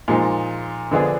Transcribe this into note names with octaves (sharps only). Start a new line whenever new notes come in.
A#2 F3 G#3 D#4
D3 F3 B3 D4 G#4